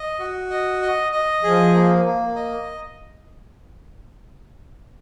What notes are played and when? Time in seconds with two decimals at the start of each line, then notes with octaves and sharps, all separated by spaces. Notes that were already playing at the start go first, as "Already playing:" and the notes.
Already playing: D#5
0.19 F#4
0.50 D#5
0.82 D#5
1.12 D#5
1.43 F3 G#4
1.74 A#3
2.05 A#3
2.36 D#5